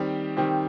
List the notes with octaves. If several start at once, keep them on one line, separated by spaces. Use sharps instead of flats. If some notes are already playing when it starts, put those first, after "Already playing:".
Already playing: D#3 G3 C4 G4
D#3 G3 C4 G4